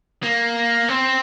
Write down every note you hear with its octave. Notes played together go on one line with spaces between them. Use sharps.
A#3
C4